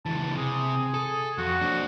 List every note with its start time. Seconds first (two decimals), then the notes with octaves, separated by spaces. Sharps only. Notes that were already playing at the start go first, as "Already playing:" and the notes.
0.06 C#2 E3 A5
0.37 C3 G#4
0.94 A4
1.38 F2 F#4
1.61 C4 D4